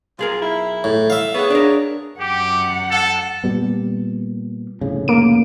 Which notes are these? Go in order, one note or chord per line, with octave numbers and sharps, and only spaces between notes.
B1 F4 G#4 A#4
E4
A2
E5 F5
B3 G#4 C#5 F#5
D4 A#4
F#2 G4 F#5
A4
A#2 G3 B3
F1 A2 C#3
A#3 D7